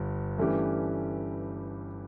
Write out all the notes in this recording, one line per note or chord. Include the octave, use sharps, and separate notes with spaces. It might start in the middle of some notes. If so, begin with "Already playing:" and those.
Already playing: G1 G2
G2 E3 A3 C#4 G4